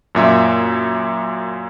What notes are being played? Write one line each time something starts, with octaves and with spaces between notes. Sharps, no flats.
F#2 A#2 E5